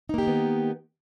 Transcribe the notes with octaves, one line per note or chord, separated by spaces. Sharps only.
D#3 A#3 B3 D#4 G4